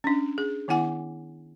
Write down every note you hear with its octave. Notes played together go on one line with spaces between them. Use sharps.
C#4 D4
G#4
D#3 B3 E4 F#5 G#5